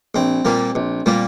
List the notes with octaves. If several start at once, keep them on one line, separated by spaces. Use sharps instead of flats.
A#1 C4
A#2 G3 A#3
A#1
A#2 G3 A#3